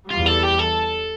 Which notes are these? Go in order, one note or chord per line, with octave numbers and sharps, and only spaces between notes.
E2 E3 G3 F4
A4
G4
A4